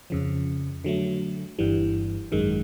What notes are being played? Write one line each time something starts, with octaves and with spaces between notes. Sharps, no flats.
F2 C#3 F3
D3 F#3 A3
G1 G2 E3 G3
G#1 F#2 D#3 G#3